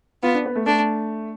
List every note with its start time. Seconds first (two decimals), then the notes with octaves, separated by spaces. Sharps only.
0.23 B3 F4
0.35 D4
0.46 B3
0.56 A3
0.66 A3 D4